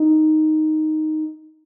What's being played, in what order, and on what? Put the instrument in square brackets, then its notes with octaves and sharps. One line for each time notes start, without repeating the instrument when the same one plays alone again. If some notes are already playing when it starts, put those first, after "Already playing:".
Already playing: [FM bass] D#4